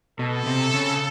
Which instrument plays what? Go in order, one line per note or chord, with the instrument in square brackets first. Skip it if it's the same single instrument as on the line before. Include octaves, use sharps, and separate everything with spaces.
[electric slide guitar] B2 [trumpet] A4
[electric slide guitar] C3
C#3